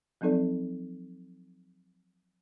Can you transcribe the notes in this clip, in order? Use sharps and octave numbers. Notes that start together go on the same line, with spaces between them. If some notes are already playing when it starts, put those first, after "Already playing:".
F3 F#3 C4 D#4 A4 D5